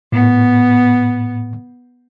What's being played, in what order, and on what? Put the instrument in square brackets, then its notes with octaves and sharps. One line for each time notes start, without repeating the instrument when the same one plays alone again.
[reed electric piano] A2 [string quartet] B3